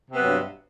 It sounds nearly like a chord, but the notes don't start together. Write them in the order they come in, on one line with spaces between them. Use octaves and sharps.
C3 B3 F#3 G2